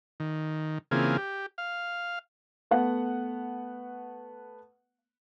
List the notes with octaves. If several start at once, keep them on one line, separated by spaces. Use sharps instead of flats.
D#3
C#3 E3 A#3 C4 F4 G#4
G4
F5
A3 B3 F#5